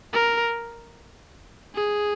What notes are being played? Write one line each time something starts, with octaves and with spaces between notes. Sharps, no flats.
A#4
G#4